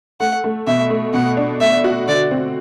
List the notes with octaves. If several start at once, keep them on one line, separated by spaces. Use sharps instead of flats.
A3 F#5
A3
B2 E5
A3
B2 F#5
D4
A3 E5
F#4
D3 D5
C4